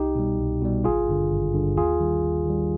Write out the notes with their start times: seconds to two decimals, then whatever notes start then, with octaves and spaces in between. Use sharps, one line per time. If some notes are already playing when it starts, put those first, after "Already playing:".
Already playing: C2 D#4 G4
0.16 B2 G3
0.39 C2
0.62 B2 G3
0.84 G#1 F4 G#4
1.08 G2 D3
1.32 G#1
1.54 G2 D3
1.76 D#2 F4 G#4
2.00 D#3 G3
2.23 D#2
2.46 D#3 G3